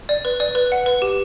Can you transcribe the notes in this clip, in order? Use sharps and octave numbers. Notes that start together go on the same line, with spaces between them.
D5
B4
D5
B4
F#5
B4
G4